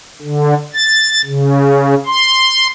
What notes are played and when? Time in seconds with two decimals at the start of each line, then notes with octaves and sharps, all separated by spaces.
0.22 D3
0.74 A6
1.25 C#3
2.06 C6